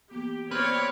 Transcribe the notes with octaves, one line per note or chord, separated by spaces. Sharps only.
E3 A#3 B3 G4
C4 G4 B4 C#5 D5 F6 G6 G#6